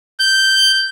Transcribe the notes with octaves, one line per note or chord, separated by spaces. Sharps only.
G6